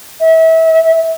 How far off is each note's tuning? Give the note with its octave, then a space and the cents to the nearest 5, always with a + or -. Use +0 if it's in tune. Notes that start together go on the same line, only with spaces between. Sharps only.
E5 -30